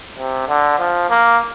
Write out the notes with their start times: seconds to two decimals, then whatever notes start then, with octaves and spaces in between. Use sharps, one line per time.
0.18 C3
0.49 D3
0.79 F3
1.10 A#3